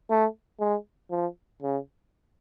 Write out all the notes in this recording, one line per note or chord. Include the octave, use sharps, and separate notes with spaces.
A3
G#3
F3
C#3